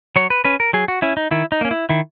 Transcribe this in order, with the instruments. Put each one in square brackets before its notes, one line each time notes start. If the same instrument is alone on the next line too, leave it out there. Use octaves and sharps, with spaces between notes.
[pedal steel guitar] F#3 C#5
B4
C#4 B4
A#4
F#3 G#4
F#4
C#4 E4
D#4
D#3 E4
D#4
A#3 C#4
E4
D#3 E4